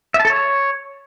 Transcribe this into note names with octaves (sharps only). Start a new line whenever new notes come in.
E5
A5
A4
C#5